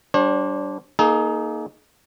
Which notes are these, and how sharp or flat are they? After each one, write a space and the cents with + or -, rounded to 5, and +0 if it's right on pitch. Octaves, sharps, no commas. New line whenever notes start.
G3 -25 D4 -15 C5 +45
A#3 +0 D#4 +0 G#4 +35